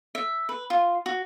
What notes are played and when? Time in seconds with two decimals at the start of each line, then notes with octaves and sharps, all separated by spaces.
0.15 E5
0.49 B4
0.70 F4
1.06 F#4